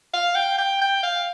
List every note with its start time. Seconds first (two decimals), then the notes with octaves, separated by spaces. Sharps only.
0.13 F5
0.35 G5
0.58 G5
0.81 G5
1.03 F5